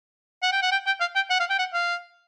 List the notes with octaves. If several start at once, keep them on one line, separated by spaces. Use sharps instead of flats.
F#5
G5
F#5
G5
G5
F5
G5
F#5
F5
G5
F#5
F5